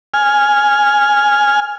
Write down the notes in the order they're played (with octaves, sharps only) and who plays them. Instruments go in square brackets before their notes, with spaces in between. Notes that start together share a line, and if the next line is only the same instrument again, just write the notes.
[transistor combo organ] G#5 F6